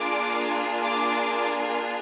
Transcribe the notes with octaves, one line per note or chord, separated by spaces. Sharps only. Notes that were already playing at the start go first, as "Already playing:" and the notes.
Already playing: A#3 D4 F4 G#4 D6
D6